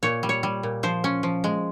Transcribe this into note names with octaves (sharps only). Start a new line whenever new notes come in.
A#2 C#5
G3
C#5
G3
A#2
F3 C5
C#4
F3
G#3